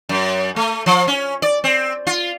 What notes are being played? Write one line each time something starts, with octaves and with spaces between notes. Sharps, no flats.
F#2
A3
F3
C#4
D5
C4
F4